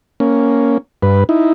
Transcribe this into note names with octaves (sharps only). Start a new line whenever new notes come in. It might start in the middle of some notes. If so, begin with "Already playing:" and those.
A#3 C#4
G2 B4
D#4 E4